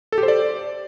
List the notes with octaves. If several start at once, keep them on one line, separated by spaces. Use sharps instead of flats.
A4
G4
C5
D5